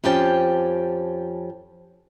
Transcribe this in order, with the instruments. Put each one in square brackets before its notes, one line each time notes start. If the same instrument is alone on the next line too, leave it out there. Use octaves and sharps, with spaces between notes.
[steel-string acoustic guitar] F2 F3 C#4 G4 G5 A5